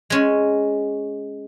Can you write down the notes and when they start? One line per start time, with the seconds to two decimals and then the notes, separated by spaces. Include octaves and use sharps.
0.10 G#3 C#4